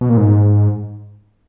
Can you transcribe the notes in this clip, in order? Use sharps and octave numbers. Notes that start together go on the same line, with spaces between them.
B2
A#2
G#2